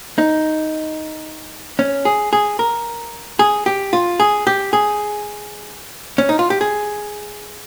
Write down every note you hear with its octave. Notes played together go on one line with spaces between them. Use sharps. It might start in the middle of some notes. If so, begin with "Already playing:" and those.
D#4
C#4
G#4
G#4
A#4
G#4
G4
F4
G#4
G4
G#4
C#4
D#4
F4
G4
G#4